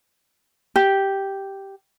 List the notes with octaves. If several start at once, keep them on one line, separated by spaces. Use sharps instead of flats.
G4